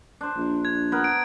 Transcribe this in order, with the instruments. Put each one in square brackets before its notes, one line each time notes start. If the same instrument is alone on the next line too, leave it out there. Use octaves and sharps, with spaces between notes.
[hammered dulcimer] D4 C5
[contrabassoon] A#1
[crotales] G#6
[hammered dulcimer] B3 A#4 B4
[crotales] D7